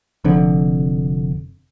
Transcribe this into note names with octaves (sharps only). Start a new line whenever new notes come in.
F1 F2 D3